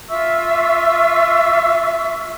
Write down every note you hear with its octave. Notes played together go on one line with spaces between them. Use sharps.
F4 E5 C#6 E6